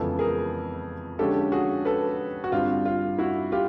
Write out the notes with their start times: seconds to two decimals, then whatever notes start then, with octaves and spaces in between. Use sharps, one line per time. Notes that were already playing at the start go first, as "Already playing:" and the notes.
Already playing: F2 C#3 E3 G#3 B3 A4
0.19 G#4 A#4
1.19 D3 F3 G#3 C#4 G4 A4
1.52 F#4 G#4
1.85 A4 B4
2.44 F#4
2.52 G2 D3 G3 C4 F4
2.85 F4
3.19 E4 F#4
3.52 F4 G4